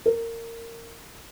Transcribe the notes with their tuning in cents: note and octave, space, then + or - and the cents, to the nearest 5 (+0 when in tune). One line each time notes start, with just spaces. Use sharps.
A#4 -20